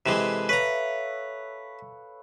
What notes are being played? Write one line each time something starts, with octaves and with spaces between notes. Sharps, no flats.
C3 E3 G#3 A4 B4
B4 C#5 E5 F5 A#5